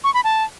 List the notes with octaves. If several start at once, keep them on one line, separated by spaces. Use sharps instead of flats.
C#6
B5
A5